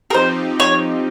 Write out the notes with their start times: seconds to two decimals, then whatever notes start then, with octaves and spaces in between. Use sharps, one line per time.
0.10 A#4
0.14 F3 C4 D#4 G4 C5
0.60 C#5